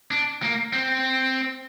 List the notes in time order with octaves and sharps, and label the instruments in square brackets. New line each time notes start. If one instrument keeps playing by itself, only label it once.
[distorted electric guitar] D4
A#3
C4